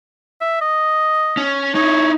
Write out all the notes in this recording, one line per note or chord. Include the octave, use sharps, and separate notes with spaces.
E5
D#5
C#4
D#4 E4 C#5